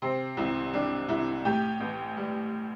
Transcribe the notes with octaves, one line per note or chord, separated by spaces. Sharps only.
C3 C4
C2 E4
G3 D4
C2 E4
A2 G4
A1
G3